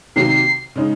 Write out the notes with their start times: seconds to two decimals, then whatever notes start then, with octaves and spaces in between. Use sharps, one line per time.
0.16 C3 D#3 F#3 A#3 C7
0.76 C#3 G#3 D#4